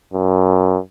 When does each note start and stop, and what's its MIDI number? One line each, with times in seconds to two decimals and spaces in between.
0.13 0.78 42